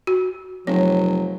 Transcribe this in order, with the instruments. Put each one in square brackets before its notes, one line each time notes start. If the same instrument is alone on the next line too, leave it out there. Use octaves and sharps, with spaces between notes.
[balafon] F#4
[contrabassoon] F1 [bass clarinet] F#3 [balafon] C#5